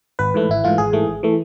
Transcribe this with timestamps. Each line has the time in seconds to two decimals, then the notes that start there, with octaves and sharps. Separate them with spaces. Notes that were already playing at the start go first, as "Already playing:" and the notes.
0.19 G#1 B4
0.34 G#2 E3 A3
0.49 G#1 E4
0.64 G#2 E3 A3 F4
0.78 G#1 G#4
0.93 G#2 E3 A3
1.07 G#1
1.23 E3 A3